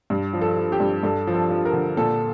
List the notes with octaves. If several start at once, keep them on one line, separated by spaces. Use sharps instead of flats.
G2
F3
A4
F3
G4
G2
G2 A4
F3
A4
F3
A#4
D3
A#2 A4